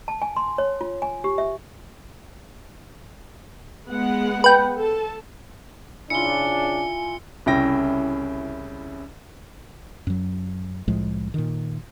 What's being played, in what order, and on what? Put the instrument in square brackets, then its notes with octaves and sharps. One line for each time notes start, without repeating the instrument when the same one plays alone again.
[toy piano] A5
G#5
C6
C#5
F4
G#5
G4
E5
[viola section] G#3 B3 F#5
[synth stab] B4 G5
[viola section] A4 A5
[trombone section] C#3 D4 [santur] E4 F4 [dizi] G#5 [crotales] C#7 G7
[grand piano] C2 C#3 C#4 E4 G5 A#6
[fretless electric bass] F#2 F#3
C2 A2 F3 G#3
A#2 D#3